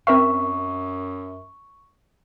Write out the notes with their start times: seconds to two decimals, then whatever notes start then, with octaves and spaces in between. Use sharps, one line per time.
0.07 F#2 C4 A#4 E5 C#6